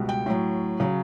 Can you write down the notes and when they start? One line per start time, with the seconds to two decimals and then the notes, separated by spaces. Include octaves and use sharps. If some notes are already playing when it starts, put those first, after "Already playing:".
Already playing: C#2 B2 G3
0.09 G5
0.26 A2 F#3
0.80 C#3 F#3